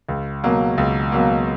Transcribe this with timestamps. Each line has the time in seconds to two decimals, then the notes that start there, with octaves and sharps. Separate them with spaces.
0.09 C#2
0.44 B2 F#3 A#3
0.78 C#2
1.12 B2 F#3 A#3